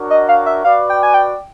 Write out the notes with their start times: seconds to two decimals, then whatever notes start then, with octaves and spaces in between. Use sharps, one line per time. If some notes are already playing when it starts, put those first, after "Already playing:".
Already playing: D4 F#4 A#4 C#5 F#5
0.10 D#5
0.29 F5
0.46 E5
0.65 F#4 B4 D5 F5
0.90 G5
1.03 G#5
1.14 G5